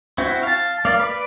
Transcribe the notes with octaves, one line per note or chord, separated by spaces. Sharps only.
C4 E4 F#4
F5 A5
A#3 D5 F5
B4 D5